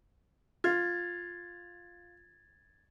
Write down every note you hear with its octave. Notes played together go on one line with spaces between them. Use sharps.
F4 G#6 A6